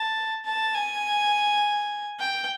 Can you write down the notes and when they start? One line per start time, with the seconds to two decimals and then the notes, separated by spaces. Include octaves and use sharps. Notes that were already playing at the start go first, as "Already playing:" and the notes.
Already playing: A5
0.45 A5
0.74 G#5
2.20 G5